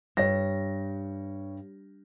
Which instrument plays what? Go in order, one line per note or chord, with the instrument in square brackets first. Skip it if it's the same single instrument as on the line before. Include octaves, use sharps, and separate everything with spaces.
[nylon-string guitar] G2 [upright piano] C#5 A#6